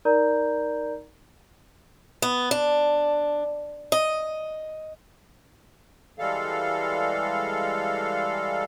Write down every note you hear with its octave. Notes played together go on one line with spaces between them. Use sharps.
D#4 A#4 D5 A#5 G6
B3
D4
D#5
E3 G3 G#3 A4 F5